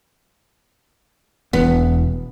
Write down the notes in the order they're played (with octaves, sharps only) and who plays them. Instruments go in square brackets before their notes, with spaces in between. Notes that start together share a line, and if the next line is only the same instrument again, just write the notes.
[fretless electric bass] E1 E2 [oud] B3